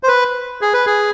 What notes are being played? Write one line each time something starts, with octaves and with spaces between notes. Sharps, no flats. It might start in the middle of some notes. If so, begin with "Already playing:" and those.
C5
B4
G#4
B4
G#4